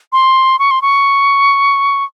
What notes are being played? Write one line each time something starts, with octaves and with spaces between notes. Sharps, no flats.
C6
C#6
C6
C#6